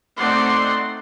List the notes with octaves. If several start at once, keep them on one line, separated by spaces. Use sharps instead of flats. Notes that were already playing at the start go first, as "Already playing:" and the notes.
A3 C4 D#4 D5 F#5 C6